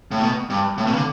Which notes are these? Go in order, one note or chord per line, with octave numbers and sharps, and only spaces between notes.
A2
B2
G2
A2
B2
C#3
D3